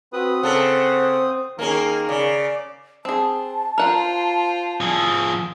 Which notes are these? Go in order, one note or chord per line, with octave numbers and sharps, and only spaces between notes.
C4 F#4 B4 D#6
C#3 A4 C5 F#5
D#3 A#3 C#4 G#4 A#4
C#3 D5
C4 G#4 A5
F4 A#4 C5 F#5
F3 G#4